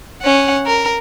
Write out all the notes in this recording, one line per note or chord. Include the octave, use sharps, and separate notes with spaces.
C#4 F#5
A#4